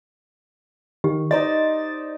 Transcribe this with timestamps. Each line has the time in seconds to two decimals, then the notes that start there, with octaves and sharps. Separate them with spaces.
1.04 D#3 G4
1.31 D#4 C5 D5 D#5 A6